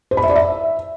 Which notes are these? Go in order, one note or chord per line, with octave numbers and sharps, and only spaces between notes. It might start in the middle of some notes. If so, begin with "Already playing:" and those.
C5
B5
E5
D5
E5